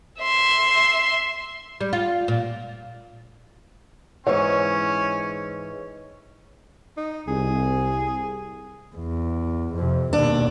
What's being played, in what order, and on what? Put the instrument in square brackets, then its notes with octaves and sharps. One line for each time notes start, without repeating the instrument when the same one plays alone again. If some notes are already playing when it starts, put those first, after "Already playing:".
[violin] E5 C6
[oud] G3
F4
A#2
[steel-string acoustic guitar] G#2 E3 [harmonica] C#4 [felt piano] C#5
[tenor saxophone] D#4
[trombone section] C2 [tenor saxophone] G#4
[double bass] E2
F2 C3
[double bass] D#2 B2 [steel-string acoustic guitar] D4